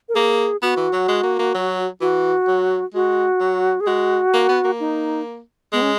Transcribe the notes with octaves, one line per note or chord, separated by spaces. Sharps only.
A#4
A#3 G#4
B3 F#4
E3
F#3
G#3
A#3
A#3
F#3
E3 F#4
F#3
G#3 F#4
F#3
G#4
G#3 F#4
A#3
B3
A#3
D#4
G#3 B3
C#4